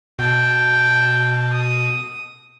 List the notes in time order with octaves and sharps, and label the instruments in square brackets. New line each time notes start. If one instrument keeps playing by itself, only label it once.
[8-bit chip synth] B2 [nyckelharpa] G5 A5
[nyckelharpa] D#6